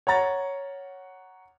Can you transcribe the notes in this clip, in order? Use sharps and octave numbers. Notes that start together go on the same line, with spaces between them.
C#5 F#5 A#5 A6